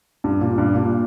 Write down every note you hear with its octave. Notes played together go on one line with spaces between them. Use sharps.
G2
A#2
G2
A#2